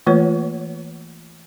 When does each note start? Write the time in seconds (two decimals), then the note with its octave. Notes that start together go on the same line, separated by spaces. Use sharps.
0.07 E3 A3 A#3 F4 B4 C#5